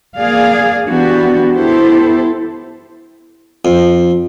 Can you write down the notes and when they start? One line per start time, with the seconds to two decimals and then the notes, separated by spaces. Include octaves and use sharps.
0.17 A#3 G#4 D5 F5
0.87 E3 B3 D4 F#4 G4
1.55 B3 E4 G4 A4 C5
3.65 F2